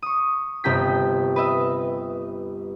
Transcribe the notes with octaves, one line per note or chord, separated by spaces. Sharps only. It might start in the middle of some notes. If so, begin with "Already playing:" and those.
C#6 D#6
G1 C3 G5 B6
B4 D#5 E5